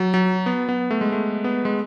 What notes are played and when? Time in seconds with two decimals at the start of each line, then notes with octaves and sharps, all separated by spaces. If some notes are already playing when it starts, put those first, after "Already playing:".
Already playing: F#3
0.14 F#3
0.46 B3
0.69 B3
0.91 A3
1.01 G#3
1.12 A3
1.44 B3
1.65 G#3